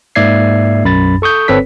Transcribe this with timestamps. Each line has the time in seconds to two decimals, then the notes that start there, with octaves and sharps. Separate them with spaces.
0.15 G#2 A#3 D5 E5 G#6 C7
0.84 B1 F#2 B5 A6
1.22 A4 C#6 D#6 G6
1.48 G1 C4 A4 B4 C#5 B6